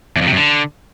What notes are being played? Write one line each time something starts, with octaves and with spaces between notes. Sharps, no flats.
E2
F2
C3
F#2
D3